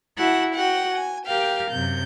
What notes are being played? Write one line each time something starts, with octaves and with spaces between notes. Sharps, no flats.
E4 F#4 F#5 A5
F#4 F#5 G5
G#5
G4 A#4 F5 G5
F#2 C3 G6